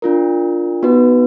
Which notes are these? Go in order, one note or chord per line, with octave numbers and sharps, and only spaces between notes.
D4 F4 A#4
B3 D#4 F#4 B4